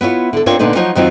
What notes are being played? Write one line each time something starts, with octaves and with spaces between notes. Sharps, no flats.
B3 E4 F4 C#5
D3 A4
C4 D4 F4 A#4 C#5
A#2 D3 B3 D4 D#4
F3 F#3 D#4 F4 C5 C#5
F#2 D#3 F#3 C4 F4